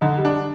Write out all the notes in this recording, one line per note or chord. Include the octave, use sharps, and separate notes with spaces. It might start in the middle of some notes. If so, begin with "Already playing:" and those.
D3 D#4
G3
D4